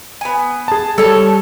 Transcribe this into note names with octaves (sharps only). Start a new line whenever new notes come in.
B3 G#5
G#4 A5
G3 A4 C#5 A5